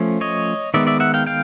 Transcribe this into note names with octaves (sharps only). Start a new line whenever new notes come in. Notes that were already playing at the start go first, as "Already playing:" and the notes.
Already playing: F3 A3 C#4
C#5 D#5
D#3 G#3 B3 D5 E5
D5 E5
E5 F#5
F5 G5
F5 G5